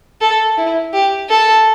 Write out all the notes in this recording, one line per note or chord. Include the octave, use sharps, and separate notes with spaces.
A4
E4
G4
A4